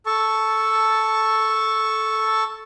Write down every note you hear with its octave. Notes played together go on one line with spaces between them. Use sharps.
A4 A5 C#6